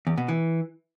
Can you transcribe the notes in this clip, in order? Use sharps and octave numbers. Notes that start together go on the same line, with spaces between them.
E2
B2
E3